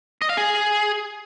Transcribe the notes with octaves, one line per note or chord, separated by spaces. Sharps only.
D#5
F5
G#4